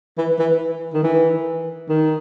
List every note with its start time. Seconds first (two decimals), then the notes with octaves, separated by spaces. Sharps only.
0.18 E3
0.39 E3
0.94 D#3
1.03 E3
1.89 D#3